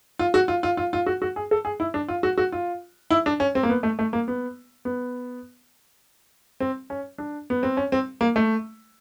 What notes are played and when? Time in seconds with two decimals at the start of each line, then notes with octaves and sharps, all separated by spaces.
0.19 F4
0.34 F#4
0.48 F4
0.63 F4
0.77 F4
0.93 F4
1.07 F#4
1.22 F#4
1.36 G#4
1.51 A4
1.65 G#4
1.80 E4
1.94 D4
2.08 F4
2.23 F#4
2.38 F#4
2.52 F4
3.11 E4
3.26 D4
3.40 C#4
3.55 C4
3.63 A#3
3.69 B3
3.83 A3
3.99 A3
4.13 A#3
4.28 B3
4.85 B3
6.60 C4
6.90 C#4
7.18 D4
7.50 B3
7.63 C4
7.77 C#4
7.92 C4
8.21 A#3
8.36 A3